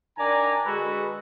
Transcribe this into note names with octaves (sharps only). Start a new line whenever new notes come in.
D#3 D4 D5 G#5 A#5
D3 G#3 F#4 A4 B4